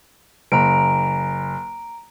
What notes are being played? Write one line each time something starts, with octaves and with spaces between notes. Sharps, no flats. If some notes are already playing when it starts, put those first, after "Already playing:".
F#1 A#5 D7